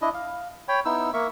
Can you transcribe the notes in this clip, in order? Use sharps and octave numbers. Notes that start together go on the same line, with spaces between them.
D4 E4 D#5
F5
C#5 G5 B5
B3 D#4 E4 E6
A#3 A#4 E5 C#6